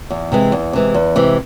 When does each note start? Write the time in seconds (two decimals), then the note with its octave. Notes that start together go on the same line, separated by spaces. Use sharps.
0.10 E2
0.32 C3 E3 G#3
0.52 E2
0.73 C3 E3 G#3
0.94 E2
1.16 C3 E3 G#3